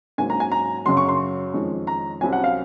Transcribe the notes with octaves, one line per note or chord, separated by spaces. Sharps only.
G#2 F#3 A#3 C#4 G#5
A#5
G#5
A#5
F#2 C#3 F#3 C6
C#6
C6
F2 D#3 G#3 C#4
A#5
C2 C3 F#3 C#4 G#5
F#5
F5